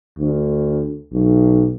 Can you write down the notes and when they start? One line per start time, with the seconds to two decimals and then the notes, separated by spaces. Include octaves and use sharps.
0.19 D2
1.13 B1